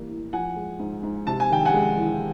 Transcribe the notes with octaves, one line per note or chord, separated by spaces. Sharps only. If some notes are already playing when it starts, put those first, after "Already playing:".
Already playing: E3 G3 A#3
A2
F3 F#5 G#5
G#3
G#2
G#2
C3 A5
G#5
D#3 G5
F#5 G#5
G#3
E2